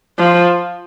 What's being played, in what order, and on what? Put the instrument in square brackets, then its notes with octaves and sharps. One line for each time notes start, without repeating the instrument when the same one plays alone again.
[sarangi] F3